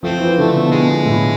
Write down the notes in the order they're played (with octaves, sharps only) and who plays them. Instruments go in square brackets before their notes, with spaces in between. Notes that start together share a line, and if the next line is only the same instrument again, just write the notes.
[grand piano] F3 [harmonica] A3 C4
[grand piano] E3
[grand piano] D3 [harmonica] A3
[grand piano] B2
[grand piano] B2 [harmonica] G#3
[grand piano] B2
A2